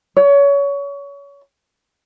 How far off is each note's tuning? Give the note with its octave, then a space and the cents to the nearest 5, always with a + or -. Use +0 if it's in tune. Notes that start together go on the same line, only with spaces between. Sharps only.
C#5 +25